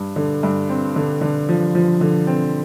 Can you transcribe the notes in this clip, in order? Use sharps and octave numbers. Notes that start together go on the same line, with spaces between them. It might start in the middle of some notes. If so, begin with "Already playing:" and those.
Already playing: G2
D3
G2
C4
D3
D3
F3
F3
D3
C4